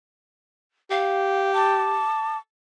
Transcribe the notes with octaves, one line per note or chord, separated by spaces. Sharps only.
G4 F5
A5 D6